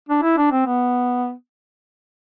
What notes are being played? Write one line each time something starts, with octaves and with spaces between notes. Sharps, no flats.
D4
E4
D4
C4
B3